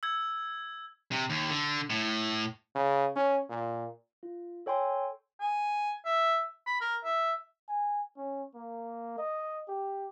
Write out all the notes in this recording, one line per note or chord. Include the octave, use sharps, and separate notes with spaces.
E6 G#6
C3
D#2
D3
A2
C#3
C#4
A#2
F4
A4 C#5 G5 G#5 C6
G#5
E5
B5
A#4
E5
G#5
C#4
A#3
D#5
G4